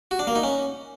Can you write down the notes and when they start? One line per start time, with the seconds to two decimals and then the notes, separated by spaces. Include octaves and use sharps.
0.11 F#4
0.19 D4
0.27 A#3
0.35 D#4
0.43 C#4